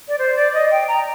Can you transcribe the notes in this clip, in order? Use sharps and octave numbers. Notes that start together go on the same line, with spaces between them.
D5
C5
D5
D#5
G5
A#5